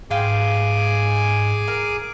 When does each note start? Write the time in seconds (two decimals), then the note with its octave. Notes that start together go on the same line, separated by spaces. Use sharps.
0.11 G#2 G#4 F5 G5 G#5 C6 D6
1.68 A#4